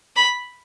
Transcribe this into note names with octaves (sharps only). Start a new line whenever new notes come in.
B5